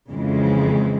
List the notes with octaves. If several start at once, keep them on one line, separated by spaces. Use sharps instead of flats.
F2 C#3 E3 G#3